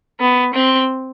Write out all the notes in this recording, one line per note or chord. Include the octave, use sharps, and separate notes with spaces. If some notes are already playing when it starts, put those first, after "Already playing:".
B3
C4